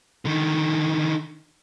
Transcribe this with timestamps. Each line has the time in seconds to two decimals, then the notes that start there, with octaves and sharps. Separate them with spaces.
0.25 D3 D#3